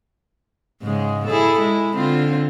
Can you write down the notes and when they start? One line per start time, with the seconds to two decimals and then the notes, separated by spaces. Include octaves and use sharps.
0.82 G#2 C#3 G#3
1.26 E4 G#4 A4
1.58 G#3 E4
1.96 D3 C4 F4